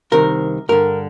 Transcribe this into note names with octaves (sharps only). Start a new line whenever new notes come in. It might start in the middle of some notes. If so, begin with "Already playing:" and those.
C2 C3 D#3 A#4
G2 D3 A#4